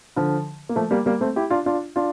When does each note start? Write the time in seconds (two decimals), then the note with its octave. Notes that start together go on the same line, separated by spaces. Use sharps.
0.16 D3 F3
0.69 A#3
0.76 F3 A3
0.91 G3 A#3
1.06 G3 A#3
1.21 A3 C4
1.36 E4 G4
1.50 D4 F4
1.66 D4 F4
1.96 D4 F4